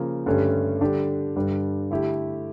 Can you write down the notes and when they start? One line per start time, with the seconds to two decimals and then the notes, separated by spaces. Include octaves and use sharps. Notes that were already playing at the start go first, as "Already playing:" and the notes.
Already playing: C#3 F3 A#3
0.26 G2 D3 A3 C#4 G4
0.81 D3 G3 D4 G4
1.36 G2 D3 G3
1.91 D3 A3 E4 G4